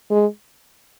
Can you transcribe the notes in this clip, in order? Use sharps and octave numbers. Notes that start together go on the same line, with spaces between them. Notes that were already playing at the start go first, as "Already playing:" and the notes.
G#3